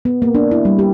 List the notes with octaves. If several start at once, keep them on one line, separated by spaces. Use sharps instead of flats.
B3
A#3
D4
E4
G3
G4